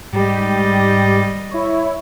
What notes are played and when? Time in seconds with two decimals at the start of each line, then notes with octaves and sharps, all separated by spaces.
0.13 G#2 G3 G4 D#5
1.51 E4 C#5